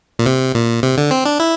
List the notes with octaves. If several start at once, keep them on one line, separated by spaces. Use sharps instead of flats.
A#2
C3
A#2
C3
D3
C4
D4
E4